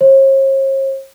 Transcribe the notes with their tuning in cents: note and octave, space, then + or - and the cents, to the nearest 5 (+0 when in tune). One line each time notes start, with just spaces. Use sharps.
C#5 -45